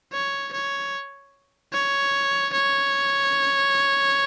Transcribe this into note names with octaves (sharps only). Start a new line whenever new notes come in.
C#5
C#5
C#5
C#5